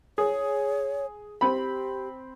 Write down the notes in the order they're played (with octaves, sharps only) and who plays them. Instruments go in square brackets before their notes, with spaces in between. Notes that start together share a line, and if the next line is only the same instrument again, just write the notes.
[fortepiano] G#4 [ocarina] C#5
[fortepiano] C4 B5 [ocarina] G4